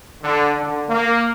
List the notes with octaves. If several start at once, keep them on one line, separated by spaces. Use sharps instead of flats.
D3
D3
A#3